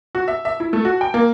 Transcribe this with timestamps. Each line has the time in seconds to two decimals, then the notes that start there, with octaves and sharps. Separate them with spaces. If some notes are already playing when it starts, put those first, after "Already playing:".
0.15 F#4
0.28 E5
0.45 E5
0.60 E4
0.73 A3
0.85 F#4
1.01 G5
1.14 A#3